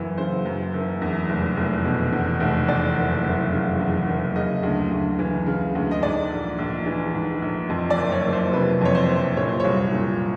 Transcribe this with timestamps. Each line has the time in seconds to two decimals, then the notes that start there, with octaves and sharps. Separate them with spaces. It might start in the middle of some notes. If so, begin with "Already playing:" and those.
Already playing: F#1 F#2 E3
0.18 C#3 C5
0.46 F#2
0.73 F#1
1.02 E2
1.29 F1
1.57 F1
1.85 B2
2.12 E2
2.40 F1
2.68 E2 D5
2.97 F#1
3.24 F#1
3.52 C#3
3.80 E2
4.07 F#1
4.36 C#3 D#5
4.63 D2
4.91 D2
5.19 E3
5.46 C#3
5.75 D2
5.91 D#5
6.03 G#2 D5
6.30 A#1
6.58 A#1
6.86 E3
7.14 G#2
7.42 A#1
7.69 F2
7.90 D5
7.98 F#1
8.12 C#5
8.25 F#1
8.33 C5
8.53 C3 B4
8.81 F2 C#5
8.95 C5
9.09 F#1
9.37 A#2 C#5
9.48 C5
9.60 C2 C#5
9.92 A#2